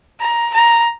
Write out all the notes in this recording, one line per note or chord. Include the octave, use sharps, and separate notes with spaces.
A#5
A#5